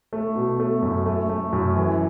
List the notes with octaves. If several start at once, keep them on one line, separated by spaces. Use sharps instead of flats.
A3
B2
A3
F#2
A3
A3
F#2
E3